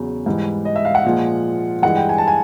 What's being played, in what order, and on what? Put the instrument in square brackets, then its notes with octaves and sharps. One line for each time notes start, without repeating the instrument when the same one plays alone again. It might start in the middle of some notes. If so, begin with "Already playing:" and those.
Already playing: [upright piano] E2 C#3 F#3
G#2 E3 G3
D#5
E5
F5
F#5
A#2 F3 G#3
G2 E3 G#3 F#5
G5
G#5
A5
G#5